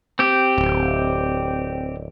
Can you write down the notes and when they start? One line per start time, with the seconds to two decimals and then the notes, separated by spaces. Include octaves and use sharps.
0.19 C4 G4
0.58 D1